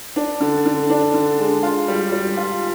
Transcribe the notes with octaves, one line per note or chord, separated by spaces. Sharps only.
D4
D3
D3
D4
D3
G#3
F4
G3
G3
F4